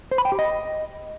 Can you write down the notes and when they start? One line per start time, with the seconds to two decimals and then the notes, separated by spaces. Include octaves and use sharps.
0.11 C5
0.18 B5
0.25 G5
0.32 G4
0.39 D#5